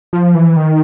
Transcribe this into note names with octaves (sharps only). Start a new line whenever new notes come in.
F3
E3
D#3